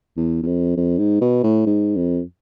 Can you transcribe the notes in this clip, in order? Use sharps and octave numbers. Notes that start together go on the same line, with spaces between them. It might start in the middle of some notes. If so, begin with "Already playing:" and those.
E2
E2
F2
F2
G#2
B2
A2
G#2
F2